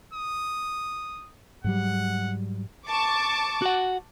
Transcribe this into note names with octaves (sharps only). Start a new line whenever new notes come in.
D#6
G#2 F#3 G3 F#5
A5 C#6 D6
F#4 F#5